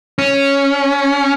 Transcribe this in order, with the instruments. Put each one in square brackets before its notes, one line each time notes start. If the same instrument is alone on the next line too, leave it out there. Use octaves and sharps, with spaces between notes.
[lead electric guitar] C#4